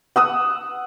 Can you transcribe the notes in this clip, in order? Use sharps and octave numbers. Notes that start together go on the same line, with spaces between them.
F#5 D#6 E6